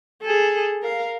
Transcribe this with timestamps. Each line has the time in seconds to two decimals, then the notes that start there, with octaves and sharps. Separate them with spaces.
0.23 G#4 A4
0.82 A#4 F5